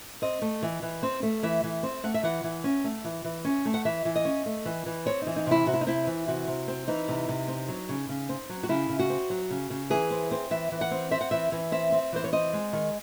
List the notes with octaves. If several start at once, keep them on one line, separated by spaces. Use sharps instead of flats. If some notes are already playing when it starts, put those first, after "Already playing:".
C4 D#5
A3
E3
E3
C4
A3
E3 E5
E3
C4
A3 F#5
E5
E3 F#5
E3
C#4
A3
E3
E3
C#4
A3
F#5
E3 E5
E3
D#5
C#4
A3
E3
E3
C4 C#5
E3 D#4
D#4
C3 E4
C3 F#4
E4
D#4
C4 E4
E3
C3 F#4
C3
C4
E3 D#4
C3
C3
C4
F#3
C#3
C#3
C4
F#3
F#4
C#3 E4
C#3
F#4
C4
F#3
C#3
C#3
E3 G#4
C4
C4
E3 E5
E3
F#5
C4
C4 E5
F#5
E3 E5
E3
C4 E5
C4
E3 C5
C#5
C4 D#5
G#3
D#3